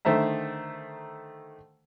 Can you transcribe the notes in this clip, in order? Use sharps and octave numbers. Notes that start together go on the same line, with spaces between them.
D3 D#3 A3 C5 E5 A#5